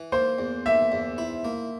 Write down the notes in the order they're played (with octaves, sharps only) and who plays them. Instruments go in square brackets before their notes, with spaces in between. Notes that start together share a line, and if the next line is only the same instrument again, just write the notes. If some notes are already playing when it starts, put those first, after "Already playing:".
Already playing: [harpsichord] E3
[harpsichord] A#3 [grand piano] C5
[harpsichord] E2
[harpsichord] A#3 [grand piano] E5
[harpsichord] E2
E4
A#3